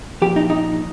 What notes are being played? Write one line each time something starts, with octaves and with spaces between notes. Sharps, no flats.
A#2 F3 G4
D#4
D#4